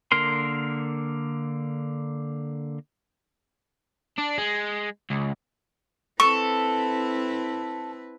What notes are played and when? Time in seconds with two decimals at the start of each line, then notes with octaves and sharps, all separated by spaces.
0.12 D3 A#3 A#4 C6
4.18 D4
4.38 G#3
5.11 C#2
6.20 C4 E4 A4 B4 C#6